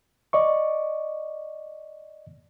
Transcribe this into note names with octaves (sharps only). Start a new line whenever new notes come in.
D5 D#5 C#6